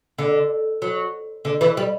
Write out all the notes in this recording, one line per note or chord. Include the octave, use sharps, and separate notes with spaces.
D3
F#3
D3
E3
G3